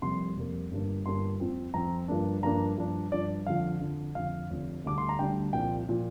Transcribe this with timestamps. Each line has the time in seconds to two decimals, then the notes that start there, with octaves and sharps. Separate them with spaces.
0.02 F1 F2 C3 G3 A#3 C6
0.37 F1 F2 C3 G3 A#3
0.71 G1 G2 G3 A#3 D4
1.05 G1 G2 G3 A#3 D4 C6
1.40 F2 F3 C4
1.74 F2 F3 C4 A#5
2.08 G2 F3 A#3 D4
2.43 G2 F3 A#3 D4 A#5
2.77 G2 F3 D4
3.12 G2 F3 D4 D5
3.47 F2 D3 F3 F5
3.81 F2 D3 F3
4.15 F1 F2 D3 F3 F5
4.50 F1 F2 D3 F3
4.84 D2 D3 G3 D4 D6
4.98 C6
5.09 A#5
5.19 D2 D3 G3 D4 G5
5.53 C2 A#2 F3 G5
5.89 A#2 F3